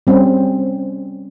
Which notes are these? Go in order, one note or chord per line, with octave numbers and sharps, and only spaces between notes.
G3 C4 C#4